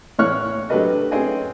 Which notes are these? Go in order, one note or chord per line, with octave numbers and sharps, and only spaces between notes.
A2 E3 C#5 C#6 F6 F#6
F#3 A3 D4 G4 B4 D#5
C4 C#4 D#4 G#4 B4 D#5